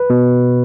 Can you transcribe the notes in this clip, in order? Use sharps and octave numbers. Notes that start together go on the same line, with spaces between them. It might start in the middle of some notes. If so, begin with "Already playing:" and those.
Already playing: B4
B2